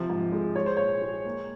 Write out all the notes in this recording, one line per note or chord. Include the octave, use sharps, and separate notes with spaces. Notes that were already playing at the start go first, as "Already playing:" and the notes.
Already playing: C3 F3
G#2
G#3
G#3 C#5
C5
A#2 C#5
G#3
A#3